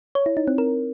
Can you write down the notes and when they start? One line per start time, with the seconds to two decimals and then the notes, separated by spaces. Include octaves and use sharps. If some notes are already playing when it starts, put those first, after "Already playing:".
0.15 C#5
0.26 E4
0.37 D#4
0.48 C4
0.58 A#4